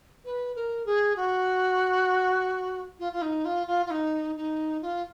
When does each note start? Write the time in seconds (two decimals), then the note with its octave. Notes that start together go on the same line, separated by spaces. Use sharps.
0.25 B4
0.56 A#4
0.86 G#4
1.16 F#4
3.00 F4
3.13 F4
3.22 D#4
3.45 F4
3.67 F4
3.86 F4
3.91 D#4
4.37 D#4
4.82 F4